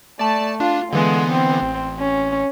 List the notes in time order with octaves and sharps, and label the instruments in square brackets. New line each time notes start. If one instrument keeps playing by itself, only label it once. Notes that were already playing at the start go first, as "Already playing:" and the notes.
[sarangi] A3 [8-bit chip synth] D5 A5
[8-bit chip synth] D4 [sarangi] F4
[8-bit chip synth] D3 E3 B3 [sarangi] G#3
[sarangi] C4
[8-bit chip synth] A1
[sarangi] C#4